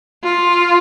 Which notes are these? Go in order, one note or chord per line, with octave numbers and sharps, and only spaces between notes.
F4